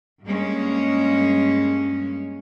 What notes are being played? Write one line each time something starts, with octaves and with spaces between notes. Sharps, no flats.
G2 G#3 A#3 C#4